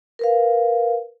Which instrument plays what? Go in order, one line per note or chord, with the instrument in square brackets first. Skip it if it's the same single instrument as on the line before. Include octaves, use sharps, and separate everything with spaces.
[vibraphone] A#4 B4 F5